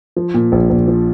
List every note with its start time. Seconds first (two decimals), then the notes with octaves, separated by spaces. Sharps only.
0.16 F3
0.34 A#2
0.52 A#1
0.70 A#1
0.88 F3